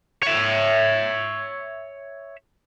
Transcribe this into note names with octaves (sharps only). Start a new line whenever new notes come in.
C#5 E5